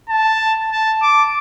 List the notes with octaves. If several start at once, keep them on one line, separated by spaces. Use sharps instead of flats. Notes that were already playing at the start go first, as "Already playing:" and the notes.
A5
A5
D6